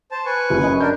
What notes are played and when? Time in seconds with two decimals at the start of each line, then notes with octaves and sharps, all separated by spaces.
0.11 C5 A5
0.26 B4 G#5 C#6
0.50 F#1
0.63 F#2 D#5
0.80 D4 A#4 G6